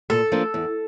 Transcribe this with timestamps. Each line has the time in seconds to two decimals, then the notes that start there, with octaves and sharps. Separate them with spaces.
0.10 A#2 A4
0.32 F3 A#3 D4 F4
0.54 E2